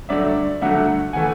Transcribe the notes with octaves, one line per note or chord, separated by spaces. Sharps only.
G2 D3 F#3 A3 D5 E5
G2 D3 F#3 A3 E5 F#5
C#3 E3 A3 F#5 G#5